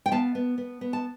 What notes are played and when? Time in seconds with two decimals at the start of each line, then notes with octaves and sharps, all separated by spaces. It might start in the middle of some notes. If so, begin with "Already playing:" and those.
0.06 G5
0.12 B3 F5 A5
0.35 B3
0.58 B3
0.81 B3
0.93 A5